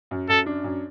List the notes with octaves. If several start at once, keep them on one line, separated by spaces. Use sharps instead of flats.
F#2
F#2 A4
D4
F#2